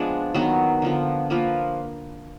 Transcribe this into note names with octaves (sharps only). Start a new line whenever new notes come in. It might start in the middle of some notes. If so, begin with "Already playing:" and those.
Already playing: F3 G#3 B3 D4
D#3 F#3 B3
D3 F3 B3
F3 A#3 F4 B4